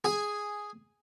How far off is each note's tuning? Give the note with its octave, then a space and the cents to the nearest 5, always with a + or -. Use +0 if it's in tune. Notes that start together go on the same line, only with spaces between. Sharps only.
G#4 +0 G#5 -5